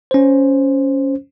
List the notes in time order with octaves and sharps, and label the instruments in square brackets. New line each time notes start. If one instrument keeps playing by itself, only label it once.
[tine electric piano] C#4 C5